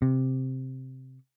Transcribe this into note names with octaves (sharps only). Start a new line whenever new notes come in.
C3